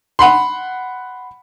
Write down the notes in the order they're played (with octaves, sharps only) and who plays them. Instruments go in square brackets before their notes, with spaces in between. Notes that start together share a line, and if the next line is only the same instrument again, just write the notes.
[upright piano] F#5 B5 C6